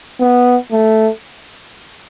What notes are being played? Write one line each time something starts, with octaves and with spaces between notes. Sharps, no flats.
B3
A3